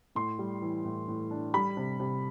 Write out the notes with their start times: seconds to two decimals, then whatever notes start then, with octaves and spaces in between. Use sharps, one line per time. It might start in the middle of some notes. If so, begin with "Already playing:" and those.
0.15 A2 C6
0.39 G3
0.62 E3
0.84 A2
1.08 A2
1.31 D4
1.54 G3 B5
1.77 C3
2.00 C3